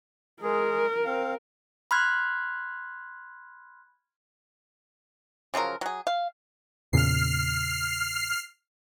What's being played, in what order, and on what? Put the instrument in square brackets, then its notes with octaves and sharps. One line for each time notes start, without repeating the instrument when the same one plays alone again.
[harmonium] G#3 G#4 [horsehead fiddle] A#4
[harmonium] C4 F5
[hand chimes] B5 C6 F6 F#6 G#6
[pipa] C#3 F3 F#3 A#4
F#3 G#4
F5
[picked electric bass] E2 A#2 C#3 [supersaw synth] F6 C7